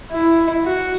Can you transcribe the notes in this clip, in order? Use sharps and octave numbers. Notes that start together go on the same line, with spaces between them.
E4
F#4